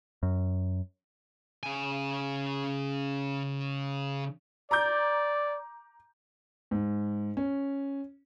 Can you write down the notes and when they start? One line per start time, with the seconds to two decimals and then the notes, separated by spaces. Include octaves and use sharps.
0.23 F#2
1.63 C#3 G#5
4.71 D5 A#5 D6 G6
6.71 G#2
7.37 C#4